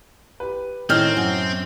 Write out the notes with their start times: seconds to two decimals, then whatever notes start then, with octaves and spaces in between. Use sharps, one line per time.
0.40 G4 B4
0.89 A2 D#3 E3 C4 C#4 F6 G6
1.17 F#2